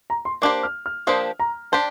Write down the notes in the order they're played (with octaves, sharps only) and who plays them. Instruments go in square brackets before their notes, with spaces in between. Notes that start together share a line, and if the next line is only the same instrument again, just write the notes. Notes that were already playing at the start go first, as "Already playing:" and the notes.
[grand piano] A#5
C6
[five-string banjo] A#3 D4 G4 C5 [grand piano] D6
[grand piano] F6
F6
[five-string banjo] F3 A#3 D4 G4 C5 [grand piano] D#6
[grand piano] A#5
[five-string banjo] D4 G4 C5 [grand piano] A5